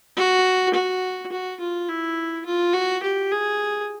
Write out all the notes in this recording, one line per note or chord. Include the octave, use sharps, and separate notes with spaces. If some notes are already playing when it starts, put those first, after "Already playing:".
F#4
F#4
F#4
F4
E4
F4
F#4
G4
G#4